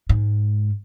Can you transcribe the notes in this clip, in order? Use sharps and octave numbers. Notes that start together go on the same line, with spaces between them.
G#2